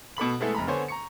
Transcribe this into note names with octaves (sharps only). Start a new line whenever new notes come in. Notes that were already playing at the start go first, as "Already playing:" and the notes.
B2 A4 B5 F#7
G#3 A3 B3 E4 G#4 A4
F1 A#5 B5
D3 B3 C5 C#5 G#5
A#5 C#6 C#7